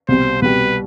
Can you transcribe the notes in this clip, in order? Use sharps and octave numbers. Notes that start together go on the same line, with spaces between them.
C2 B2 G3 C5
C2 B2 G3 B4